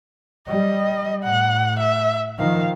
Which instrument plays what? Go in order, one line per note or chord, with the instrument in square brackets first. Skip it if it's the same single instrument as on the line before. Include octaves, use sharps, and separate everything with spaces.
[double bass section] G3 [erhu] D#5
[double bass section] A2 [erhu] F#5
[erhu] E5
[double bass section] D#3 F3 [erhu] F5